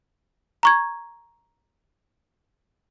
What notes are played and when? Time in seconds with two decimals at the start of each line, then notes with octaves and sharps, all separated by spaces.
0.63 A#5 C#6 G#6